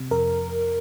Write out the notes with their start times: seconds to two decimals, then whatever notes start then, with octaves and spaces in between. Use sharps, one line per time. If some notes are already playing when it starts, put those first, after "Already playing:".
Already playing: C3
0.11 F2 A#4